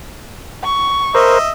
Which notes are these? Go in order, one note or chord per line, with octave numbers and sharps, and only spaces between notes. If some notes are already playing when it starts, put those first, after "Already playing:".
C#6
A#4 C5 D#5 E5